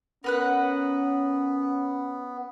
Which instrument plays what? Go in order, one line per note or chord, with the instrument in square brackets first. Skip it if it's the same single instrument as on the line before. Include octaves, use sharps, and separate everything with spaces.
[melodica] B3 [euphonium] C#4 [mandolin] A#4 B4 F#5